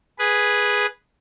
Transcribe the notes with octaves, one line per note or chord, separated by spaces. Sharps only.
G#4 B4